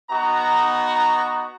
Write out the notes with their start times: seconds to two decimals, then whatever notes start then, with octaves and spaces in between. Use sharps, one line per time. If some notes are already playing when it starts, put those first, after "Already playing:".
0.10 B3 D#4 F#4 A#5
0.94 A#5